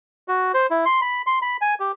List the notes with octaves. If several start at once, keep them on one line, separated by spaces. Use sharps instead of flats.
F#4
C5
E4
C6
B5
C6
B5
G#5
G4